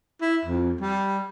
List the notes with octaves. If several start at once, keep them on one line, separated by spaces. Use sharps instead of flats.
E4
F2
G3